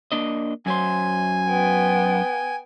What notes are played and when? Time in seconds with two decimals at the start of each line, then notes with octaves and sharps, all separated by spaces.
0.12 A#3 D4 D#5
0.66 F#2 F#3 C5 G#5
1.49 B3 G5